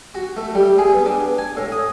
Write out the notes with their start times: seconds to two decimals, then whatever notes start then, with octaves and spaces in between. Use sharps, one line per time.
0.15 F#4
0.37 A3
0.55 G3
0.78 G#4
0.93 B3
1.06 D4
1.38 G#5
1.57 A2
1.72 D#6